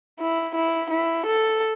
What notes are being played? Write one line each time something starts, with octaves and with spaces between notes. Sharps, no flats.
E4
E4
E4
A4